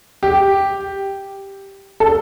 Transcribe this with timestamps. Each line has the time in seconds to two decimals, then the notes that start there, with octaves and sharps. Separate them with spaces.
0.23 G4
2.00 A4